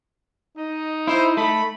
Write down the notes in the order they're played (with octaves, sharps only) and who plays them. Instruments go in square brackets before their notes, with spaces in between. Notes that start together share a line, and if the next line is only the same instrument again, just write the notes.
[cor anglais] D#4 [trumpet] D#5
[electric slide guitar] E4 [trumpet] C5
[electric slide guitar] A3 [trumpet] B5